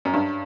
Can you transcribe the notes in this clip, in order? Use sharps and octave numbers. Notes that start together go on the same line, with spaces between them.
F#2
G2